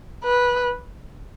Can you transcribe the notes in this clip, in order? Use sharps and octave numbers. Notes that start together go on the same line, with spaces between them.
B4